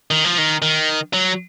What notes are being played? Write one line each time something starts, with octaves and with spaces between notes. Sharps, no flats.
D#3
F3
D#3
D#3
F#3